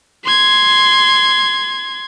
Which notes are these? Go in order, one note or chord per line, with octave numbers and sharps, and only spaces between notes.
C6 G#6